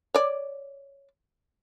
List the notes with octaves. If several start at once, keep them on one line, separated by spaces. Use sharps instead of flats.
C#5 D5